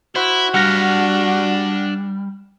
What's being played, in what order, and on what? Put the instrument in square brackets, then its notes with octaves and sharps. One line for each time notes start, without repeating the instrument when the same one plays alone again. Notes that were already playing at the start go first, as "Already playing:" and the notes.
[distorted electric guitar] E4 [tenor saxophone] F#4 [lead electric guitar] C5
[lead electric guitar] G3 [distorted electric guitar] D4 F5 [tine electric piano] F#5 F6 A#6